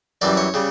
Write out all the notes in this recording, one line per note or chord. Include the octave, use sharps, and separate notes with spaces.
F#2 E3 G3 D5
C#5
C#3 G3